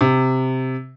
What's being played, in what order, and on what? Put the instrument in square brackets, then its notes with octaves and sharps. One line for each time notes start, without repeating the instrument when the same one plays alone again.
[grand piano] C3